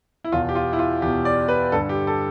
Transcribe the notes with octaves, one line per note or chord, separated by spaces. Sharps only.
E4
E2 B2 F4
G4
F4
E4
F4
E2 B2 G4
D5
B4
G2 D3 A4
G4
A4